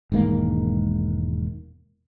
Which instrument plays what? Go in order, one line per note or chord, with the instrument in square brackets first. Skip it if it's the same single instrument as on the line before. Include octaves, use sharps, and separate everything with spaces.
[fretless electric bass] E1 G#2 D#3 A#3